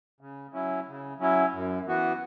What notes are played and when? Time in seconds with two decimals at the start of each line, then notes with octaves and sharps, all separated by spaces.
0.21 C#3
0.53 F#3 C#4 E4
0.87 C#3
1.20 F#3 C#4 E4
1.53 F#2
1.86 E3 B3 F#4